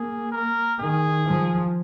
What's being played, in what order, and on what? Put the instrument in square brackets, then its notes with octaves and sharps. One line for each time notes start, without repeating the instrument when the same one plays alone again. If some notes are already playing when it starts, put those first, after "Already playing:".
Already playing: [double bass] A#3 [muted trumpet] G#4
[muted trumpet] A#4
[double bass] D#3 [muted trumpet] G#4
[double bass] F3